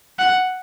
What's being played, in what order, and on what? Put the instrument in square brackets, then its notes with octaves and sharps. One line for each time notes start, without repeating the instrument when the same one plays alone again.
[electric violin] F#5